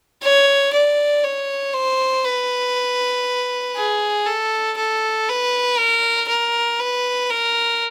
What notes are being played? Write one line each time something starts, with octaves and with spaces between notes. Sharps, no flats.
C#5
D5
C#5
C5
B4
G#4
A4
A4
B4
A#4
A#4
B4
A#4